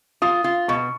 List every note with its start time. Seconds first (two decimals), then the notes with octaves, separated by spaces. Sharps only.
0.22 F4 D#6
0.44 F4
0.68 B2 C#6